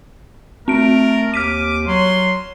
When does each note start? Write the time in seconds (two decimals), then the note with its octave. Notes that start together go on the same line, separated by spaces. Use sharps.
0.68 A3 C4 A#4 D7
1.34 D#2 D6 F6 B6 D#7
1.87 F#3 C6